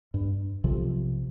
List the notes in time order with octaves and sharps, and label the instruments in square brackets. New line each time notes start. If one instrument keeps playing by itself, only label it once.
[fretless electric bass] G2
B1 C3 F3